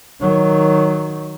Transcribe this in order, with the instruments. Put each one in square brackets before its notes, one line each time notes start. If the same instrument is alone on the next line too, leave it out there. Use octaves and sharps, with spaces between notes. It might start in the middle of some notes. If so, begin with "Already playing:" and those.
[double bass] D#3 F#3